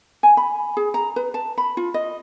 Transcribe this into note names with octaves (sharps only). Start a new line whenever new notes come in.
G#5
B5
G#4
A#5
B4
A5
B5
F4
D#5